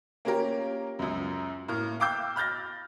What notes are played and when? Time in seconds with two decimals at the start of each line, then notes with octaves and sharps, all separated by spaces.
0.25 A#3 C#4 F4 G4 A#4
0.99 C#2 F#2
1.68 A2 A#3 F6
2.00 F5 G5 D6 E6 G6
2.36 B5 F6 G6 A6 A#6